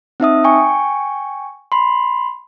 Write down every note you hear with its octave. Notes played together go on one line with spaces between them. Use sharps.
C4 D#4 E5 D#6
G5 G#5 C#6
B5 C6